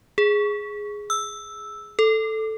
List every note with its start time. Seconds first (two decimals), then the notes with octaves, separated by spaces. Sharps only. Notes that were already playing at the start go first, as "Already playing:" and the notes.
0.18 G#4
1.10 E6
1.99 A4